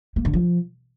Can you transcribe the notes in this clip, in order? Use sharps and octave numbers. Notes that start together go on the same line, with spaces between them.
A#3
D3
F3